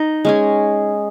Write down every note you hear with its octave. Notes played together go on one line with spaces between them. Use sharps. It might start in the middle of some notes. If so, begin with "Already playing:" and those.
Already playing: D#4
G#3 C#4 G#4